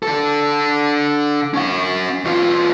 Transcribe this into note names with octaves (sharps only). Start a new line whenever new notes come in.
D3 A4
C#4 F#5
E2 F4